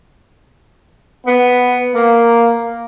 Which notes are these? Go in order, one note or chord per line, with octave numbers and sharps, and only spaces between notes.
B3
A#3